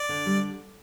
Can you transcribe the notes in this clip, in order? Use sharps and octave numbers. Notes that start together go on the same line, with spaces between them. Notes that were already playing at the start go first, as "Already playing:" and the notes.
Already playing: D5
D3
G3